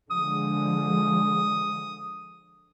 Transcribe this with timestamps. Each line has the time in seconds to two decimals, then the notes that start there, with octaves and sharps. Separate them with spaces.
0.11 D3 F3 G#3 D#6